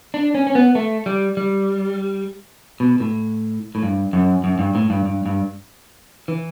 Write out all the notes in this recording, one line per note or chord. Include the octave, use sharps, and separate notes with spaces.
D4
C#4
C#4
B3
A3
G3
G3
B2
A2
A2
G2
F#2
F#2
G2
A2
G2
G2
G2
E3